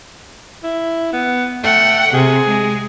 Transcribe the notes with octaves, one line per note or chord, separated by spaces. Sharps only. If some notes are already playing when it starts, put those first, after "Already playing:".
E4
B3
A3 F#5 G5
C3 G#4
G#3